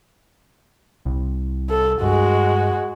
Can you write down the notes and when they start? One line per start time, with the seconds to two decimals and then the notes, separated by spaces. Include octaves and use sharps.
1.05 C2
1.70 A4
2.02 G2 G#3 F#4